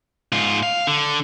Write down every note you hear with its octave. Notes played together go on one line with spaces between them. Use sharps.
G#2 F4
F5
D3